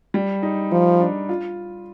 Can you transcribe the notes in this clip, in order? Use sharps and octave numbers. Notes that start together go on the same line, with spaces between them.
G3
D#4
F3 D#4
D4
F4